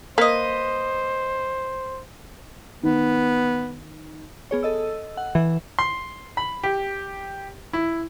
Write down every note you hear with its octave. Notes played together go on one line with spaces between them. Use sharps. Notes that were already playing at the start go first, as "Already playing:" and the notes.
A#3 B4 C5 D#5
D#3 B3
B3 G#4 C#5
A4 D#5 E6
F#5
E3 E5
C6
B5
G4
E4